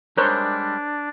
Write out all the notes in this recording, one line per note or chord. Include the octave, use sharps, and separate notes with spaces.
G3 G#3 D4 A#4 C5 C#5 F#6 G6